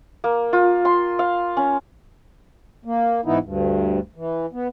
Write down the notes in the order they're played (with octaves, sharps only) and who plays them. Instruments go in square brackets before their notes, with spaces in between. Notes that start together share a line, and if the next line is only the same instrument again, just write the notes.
[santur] A#3
F4
C6
F5
C#4
[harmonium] A#3
G#2 E3 B3 D#4 E4
D2 G2
E3
B3